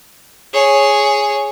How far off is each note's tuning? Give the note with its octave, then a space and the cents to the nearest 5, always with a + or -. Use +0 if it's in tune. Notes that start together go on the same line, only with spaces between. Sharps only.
G#4 +0 C#5 +0